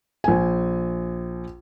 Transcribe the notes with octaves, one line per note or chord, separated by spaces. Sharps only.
A#1 G#5